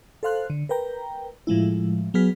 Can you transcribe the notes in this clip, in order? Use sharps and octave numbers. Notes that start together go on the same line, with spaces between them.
A4 C5 F5 C6 F#6
D3
A#4 B4 G5 A#5
A2 F3 G#3 E4
F#3 B3 G#4 F6 B6